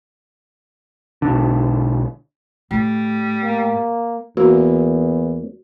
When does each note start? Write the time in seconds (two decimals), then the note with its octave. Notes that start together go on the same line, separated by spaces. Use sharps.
1.22 B1 D3
2.71 A2 G3
3.43 A#3
4.37 E2 A#3 F#4